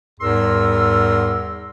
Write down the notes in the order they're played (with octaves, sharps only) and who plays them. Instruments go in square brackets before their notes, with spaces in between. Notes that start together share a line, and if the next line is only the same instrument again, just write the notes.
[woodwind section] E2 G#2 G3 A#4 C6 E6